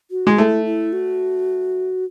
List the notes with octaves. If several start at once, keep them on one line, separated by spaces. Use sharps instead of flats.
F#4
G#3
A3 E4
E4
F#4